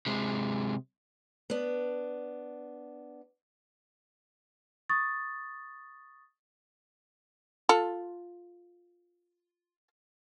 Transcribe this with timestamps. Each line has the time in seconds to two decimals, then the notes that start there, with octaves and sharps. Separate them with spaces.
0.06 C3 G#3
1.50 B3 D4
4.89 C#6 D#6 A6
7.69 F4 A4